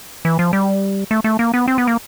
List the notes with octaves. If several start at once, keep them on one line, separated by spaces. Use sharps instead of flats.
E3
F3
G3
A3
A3
A#3
B3
C4
B3
A#3